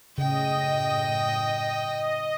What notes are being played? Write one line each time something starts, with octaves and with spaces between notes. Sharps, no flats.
F#2 A2 C#3 D#5 G5